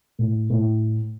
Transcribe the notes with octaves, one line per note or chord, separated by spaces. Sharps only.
A2
A2